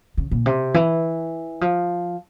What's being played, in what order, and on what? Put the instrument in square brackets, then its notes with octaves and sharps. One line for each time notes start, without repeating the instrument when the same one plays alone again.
[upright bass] C#3
A#2
C3
E3
F3